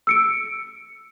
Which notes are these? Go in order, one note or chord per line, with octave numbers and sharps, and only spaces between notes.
E6 C#7 D7